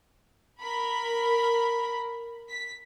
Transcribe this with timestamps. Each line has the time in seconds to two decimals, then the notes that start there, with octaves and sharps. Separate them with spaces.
0.62 A#4 B5
2.49 B6